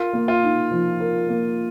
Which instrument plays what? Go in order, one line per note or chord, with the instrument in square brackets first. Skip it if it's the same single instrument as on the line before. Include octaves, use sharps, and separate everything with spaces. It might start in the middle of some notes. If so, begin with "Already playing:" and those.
Already playing: [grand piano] F4 [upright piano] A#4
[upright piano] A#3
[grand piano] F4
[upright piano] D#4
F3
A#4
A#3